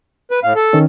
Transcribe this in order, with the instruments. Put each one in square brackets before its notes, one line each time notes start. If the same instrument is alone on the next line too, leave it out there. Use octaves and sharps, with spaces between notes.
[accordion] B4
A2 F5
A4
[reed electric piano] D#3 C#4